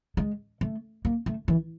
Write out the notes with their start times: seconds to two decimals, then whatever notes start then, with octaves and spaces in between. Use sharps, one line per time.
0.17 G#3
0.61 A3
1.05 A#3
1.26 A3
1.48 E3